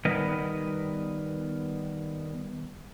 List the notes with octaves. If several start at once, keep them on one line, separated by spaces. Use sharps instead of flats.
D#3 G3 B3 A#4 B4 D#5